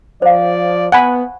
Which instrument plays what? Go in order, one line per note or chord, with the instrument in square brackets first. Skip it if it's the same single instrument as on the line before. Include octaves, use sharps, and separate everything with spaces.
[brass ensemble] F3 D5 [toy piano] C5 F5
[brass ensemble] B3 [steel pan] F#5 G#5 B5